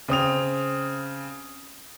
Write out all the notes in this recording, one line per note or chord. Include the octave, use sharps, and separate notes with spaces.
C#3 C4 D#6 F7